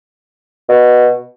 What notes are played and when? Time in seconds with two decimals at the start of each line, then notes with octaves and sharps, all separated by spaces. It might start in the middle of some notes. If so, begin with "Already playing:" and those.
0.69 B2